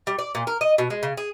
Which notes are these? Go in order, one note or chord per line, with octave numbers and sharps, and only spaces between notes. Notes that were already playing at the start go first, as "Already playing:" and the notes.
G3
D5
A#2
A#4
D#5
B2
G#3
C#3
G#4